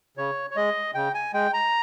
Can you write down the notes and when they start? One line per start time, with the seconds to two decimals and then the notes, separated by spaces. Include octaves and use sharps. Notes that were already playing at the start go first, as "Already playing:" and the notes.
0.17 C#3 C#5
0.50 C#5
0.56 G#3 D#5
0.95 C#3 G5
1.14 G#5
1.34 G#3 G5
1.53 A#5